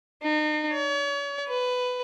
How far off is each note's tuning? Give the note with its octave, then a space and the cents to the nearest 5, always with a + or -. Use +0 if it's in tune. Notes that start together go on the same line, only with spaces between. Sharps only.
D#4 -40
C#5 +40
B4 +15